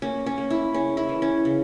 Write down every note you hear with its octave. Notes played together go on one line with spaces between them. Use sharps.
A#3 C#4
C#4
A#3
E4
C#3 C#4
E4
E3
C#4
C#3